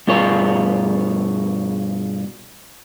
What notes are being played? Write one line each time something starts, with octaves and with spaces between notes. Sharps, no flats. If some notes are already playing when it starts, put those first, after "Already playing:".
G2 B2 F4 G#4 C#5